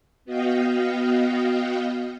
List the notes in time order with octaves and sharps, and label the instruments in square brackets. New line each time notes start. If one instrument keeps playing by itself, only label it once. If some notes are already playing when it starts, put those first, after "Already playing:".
[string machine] B3 F#4 D#5 F5 G5